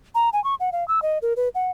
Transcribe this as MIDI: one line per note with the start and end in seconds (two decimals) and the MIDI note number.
0.15 0.29 82
0.33 0.42 80
0.44 0.55 85
0.60 0.70 78
0.72 0.87 77
0.88 1.02 88
1.02 1.18 75
1.22 1.33 70
1.36 1.49 71
1.55 1.71 78